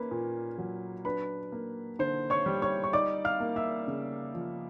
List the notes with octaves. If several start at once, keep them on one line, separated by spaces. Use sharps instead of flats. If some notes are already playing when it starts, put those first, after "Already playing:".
Already playing: A#3 C#4 B4 B5
A#2
F#3
D4 B4 B5
A#3
D3 C5 C6
C#5 C#6
G3
C#5 C#6
C#6
D#4 D5 D6
F5 F6
A#3
E5 E6
C#3
F3